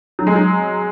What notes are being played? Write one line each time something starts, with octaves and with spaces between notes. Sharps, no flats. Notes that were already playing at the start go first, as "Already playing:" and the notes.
F#3
G#3
F#3